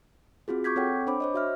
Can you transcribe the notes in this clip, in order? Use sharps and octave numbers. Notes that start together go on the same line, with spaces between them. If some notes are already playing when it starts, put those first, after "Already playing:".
C4 F4 F#4 G#4
C#6 D6 G6 G#6 B6
C4 A4 C#5 F#5 G5
D4 C5 C#5 B5 D6
C5 C#5 D#5
F#4 E5 F6